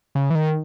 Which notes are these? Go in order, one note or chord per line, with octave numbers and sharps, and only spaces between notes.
C#3
E3
D#3